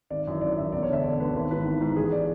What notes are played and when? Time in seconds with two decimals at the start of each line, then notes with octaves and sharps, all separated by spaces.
0.10 G#1 D5
0.27 F#2 E3
0.41 G#1 D5
0.57 F#2 E3 E5
0.73 E1 D5
0.83 C#5
0.88 D2 D3 E5
1.04 E1 D5
1.19 D2 D3 B4
1.35 G#1 B4
1.50 G#2 E3 B4
1.66 G#1
1.81 G#2 E3
1.96 A1 G#4
2.12 E3 D5